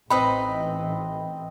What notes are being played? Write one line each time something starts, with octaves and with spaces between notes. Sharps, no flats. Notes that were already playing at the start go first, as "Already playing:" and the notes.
A1 E3 C4 D#4 B4 C5 D#5 B5